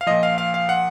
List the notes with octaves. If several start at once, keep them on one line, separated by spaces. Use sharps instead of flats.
F5
A#2 F3 D#5
F5
F5
F5
F#5